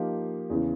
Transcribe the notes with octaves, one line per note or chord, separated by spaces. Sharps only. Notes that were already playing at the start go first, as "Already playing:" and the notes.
Already playing: F3 A#3 D#4 G4
E2 C#3 E3